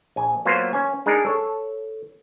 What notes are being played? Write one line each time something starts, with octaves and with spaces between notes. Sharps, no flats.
A#1 G#5
F#3 A#3 B3 F4 C5
C#4 G#5
G#3 D4 D#4 G#4 A#4
A4 C#5